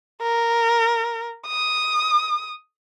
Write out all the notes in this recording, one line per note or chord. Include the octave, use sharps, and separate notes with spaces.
A#4
D#6